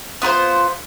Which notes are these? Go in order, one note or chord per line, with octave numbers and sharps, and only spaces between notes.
B3 F4 B4 C5